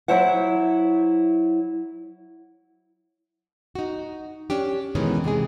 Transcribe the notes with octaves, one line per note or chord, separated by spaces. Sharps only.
F#3 E4 C5 E5 F#5
D#4 F#4
C#4 D4 G4
B2 D#3 E3 G#3 B3 C#4
C3 E3 G#3 G#4